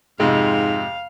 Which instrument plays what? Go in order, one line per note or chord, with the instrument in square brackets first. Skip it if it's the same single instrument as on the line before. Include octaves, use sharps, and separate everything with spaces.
[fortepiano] F2 C3 G#3 [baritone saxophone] G#2 [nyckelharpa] F5